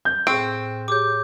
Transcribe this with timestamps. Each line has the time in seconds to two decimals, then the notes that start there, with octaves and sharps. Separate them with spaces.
0.05 G6
0.27 A2 C4 G#4 C#6 D7
0.88 G4 G#4 C#5 D6 G6